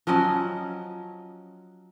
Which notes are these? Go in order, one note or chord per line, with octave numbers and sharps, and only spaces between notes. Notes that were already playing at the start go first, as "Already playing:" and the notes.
F3 F#3 C#4 D#5